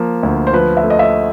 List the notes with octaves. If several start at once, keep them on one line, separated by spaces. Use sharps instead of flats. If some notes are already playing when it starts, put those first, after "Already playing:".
Already playing: F3 A#3
D2
C5
F3 B4
E5
A3
D#5
E5